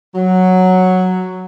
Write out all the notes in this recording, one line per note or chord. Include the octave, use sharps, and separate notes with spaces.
F#3